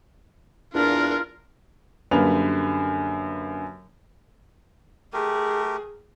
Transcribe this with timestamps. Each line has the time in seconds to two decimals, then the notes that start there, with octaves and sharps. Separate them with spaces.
0.74 E2 A#2 D4 F4 A#4
2.11 F#2 D3 G3 A#3 B4 F7
5.13 A3 G4 G#4 A#4